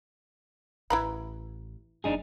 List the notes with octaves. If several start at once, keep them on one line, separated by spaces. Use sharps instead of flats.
A1 E4 B4 A#5 B5
F#1 D4 D#4 G#4